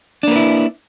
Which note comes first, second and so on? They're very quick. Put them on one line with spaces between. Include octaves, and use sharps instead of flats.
D4 A#3 B4 E4